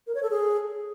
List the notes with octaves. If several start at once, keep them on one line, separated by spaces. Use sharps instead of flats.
A#4
C#5
A4
G#4